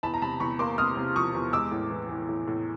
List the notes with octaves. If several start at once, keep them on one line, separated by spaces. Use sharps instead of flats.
E2 A5 B5
A#5
C3 A5 B5
E2 B5 C#6
A#3 C6 D6
C3 D#6 F6
C3
F3 C#6 D#6
E2
G#3 D6 E6
A2
E3
E3
A2
A2